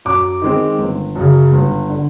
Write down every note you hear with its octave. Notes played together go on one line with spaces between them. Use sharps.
F#2 D6
D#3 G#3 C4
G1
F#2 C#3
G1
D3